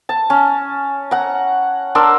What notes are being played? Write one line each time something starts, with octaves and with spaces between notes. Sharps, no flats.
A5
C#4
F#5 A#5
D4 A#4 C6 E6